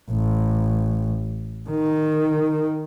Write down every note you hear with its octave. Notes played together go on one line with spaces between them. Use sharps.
A1
D#3